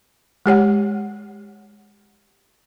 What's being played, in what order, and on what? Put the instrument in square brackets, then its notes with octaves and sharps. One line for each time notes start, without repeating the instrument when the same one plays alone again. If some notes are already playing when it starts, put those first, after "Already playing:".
[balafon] G#3 G4 C#5 F#5